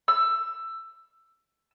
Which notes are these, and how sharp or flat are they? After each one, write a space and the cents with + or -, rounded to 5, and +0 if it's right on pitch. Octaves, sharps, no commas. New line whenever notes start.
E6 +15